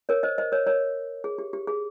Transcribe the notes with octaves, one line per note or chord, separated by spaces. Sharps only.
A#4 C#5
C5 D#5
C5 D#5
A#4 C#5
A#4 C#5
G#4
G4
G4
G#4